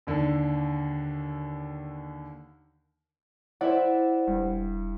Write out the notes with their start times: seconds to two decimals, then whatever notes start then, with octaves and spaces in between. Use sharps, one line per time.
0.07 D#2 D3
3.61 E4 C5 D5 E5 F#5
4.27 E1 G2